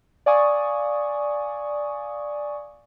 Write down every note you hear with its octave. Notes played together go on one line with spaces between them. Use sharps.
D5 F5 G#5 C#6 D#6